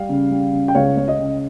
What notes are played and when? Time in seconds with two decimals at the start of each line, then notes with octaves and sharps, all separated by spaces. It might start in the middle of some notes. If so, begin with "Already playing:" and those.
Already playing: G3 F5
0.09 C#3
0.31 G3
0.53 C#3
0.68 G5
0.75 C#2 C#5 F5
0.97 C#2 C#5
1.08 D#5
1.19 C#3